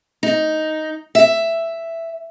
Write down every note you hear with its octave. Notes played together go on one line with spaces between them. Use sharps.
D#4
E5